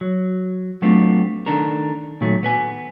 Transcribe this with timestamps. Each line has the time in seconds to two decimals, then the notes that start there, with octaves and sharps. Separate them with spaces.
0.01 F#3
0.82 F#3 A3 B3 C4 D4 F4
1.46 D#3 D4 A4 A#4
2.21 A#2 D#3 F#3 A3
2.43 B3 B4 G#5